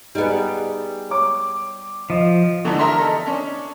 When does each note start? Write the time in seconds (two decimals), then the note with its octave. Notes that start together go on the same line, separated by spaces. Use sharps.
0.15 G3 B3 D#4 G#4
1.10 C#5 C#6 D6
2.10 F3 D#5
2.65 D3 E3 A3 B3 D4 D#4
2.79 A#4 E5 A#5 C6
2.98 D#4 A4
3.27 C#4 D4